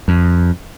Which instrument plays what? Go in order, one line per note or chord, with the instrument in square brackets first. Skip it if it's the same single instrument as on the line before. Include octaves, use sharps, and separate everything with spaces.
[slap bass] F2